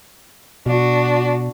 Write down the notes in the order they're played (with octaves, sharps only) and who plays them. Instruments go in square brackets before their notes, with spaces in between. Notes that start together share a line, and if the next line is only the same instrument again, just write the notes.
[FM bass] B2 [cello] D4 F#4